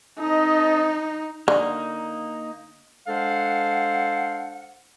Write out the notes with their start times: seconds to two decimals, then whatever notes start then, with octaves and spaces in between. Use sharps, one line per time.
0.19 C4 D#4 A4 D#5
1.48 D3 A#3 D#4
3.07 G#3 D4 A4 C5 F5 F#5